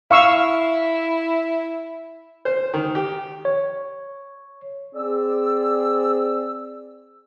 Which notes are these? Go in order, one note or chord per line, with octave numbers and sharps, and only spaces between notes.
E4 F5 C#6 E6
C5
D#3
G4
C#5
C4 G#4 D5 E6